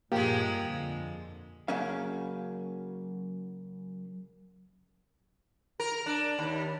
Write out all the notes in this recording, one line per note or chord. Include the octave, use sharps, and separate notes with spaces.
G2 A#2 F3 G#3 A#3 G4
F2 D3
C#3 F#3 A#3 C#4 F5
A#4
D4
D#2